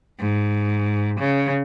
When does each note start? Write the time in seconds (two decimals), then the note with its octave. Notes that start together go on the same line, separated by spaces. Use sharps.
0.19 G#2
1.20 C#3